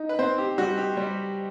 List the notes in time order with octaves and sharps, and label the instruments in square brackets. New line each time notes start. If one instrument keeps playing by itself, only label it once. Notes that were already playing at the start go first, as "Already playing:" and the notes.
Already playing: [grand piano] D#4
[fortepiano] B4
[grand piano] C4 [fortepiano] C5
[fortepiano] G4
[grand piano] G3 [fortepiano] F#4
[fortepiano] G4
[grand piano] G3